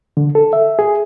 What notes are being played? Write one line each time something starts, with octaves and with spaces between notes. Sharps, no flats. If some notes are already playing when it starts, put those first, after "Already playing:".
D3
A4
E5
G#4